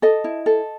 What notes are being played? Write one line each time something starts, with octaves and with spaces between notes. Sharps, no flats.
A4 D#5
E4
A4